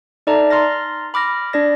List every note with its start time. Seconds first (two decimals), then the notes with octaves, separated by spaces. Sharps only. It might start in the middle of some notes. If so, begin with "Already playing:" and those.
0.27 D#4 A4 D5 E5 A5 A#5
0.50 A#5 C6 F6 A6 A#6
1.14 B5 D6 F6 A#6
1.53 D4 D5 A#6